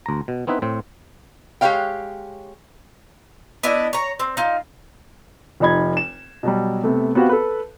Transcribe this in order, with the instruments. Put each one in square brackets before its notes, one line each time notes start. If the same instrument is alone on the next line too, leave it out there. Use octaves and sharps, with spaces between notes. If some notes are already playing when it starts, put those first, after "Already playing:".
[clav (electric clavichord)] D2 A#5
B2
B3 C4 D#4 E4 B4
A2 C4
[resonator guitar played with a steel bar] G#3 G4 B4 C#5 F5 G5
[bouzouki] B3 D4 E4 D#5
C#5 A#5
C4
D#4 F4
[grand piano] F1 F3 D#4 B5 G#6
E7
B2 F#3 G3
C3 A3 B3
B3 C4 F#4 G4 F5
A4 B4